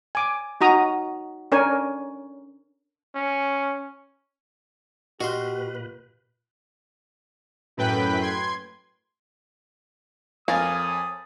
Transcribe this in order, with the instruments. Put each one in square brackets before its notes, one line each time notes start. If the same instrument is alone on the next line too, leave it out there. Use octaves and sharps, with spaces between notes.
[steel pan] G#5 D6
D#4 F#4 A#5 D#6
C#4 D4 A#4 C#5 G#5
[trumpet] C#4
[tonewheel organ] A#2 B4 [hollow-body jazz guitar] F#4 [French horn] G4 [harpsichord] D#5 F5 C6
[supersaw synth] F#2 A2 B4 G5 B5 B6
C6 G#6
[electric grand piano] F2 G#5 A6 [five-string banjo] A#4 C#5 F5 [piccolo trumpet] D#6